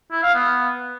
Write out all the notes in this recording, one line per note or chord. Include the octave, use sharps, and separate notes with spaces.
E4
F5
B3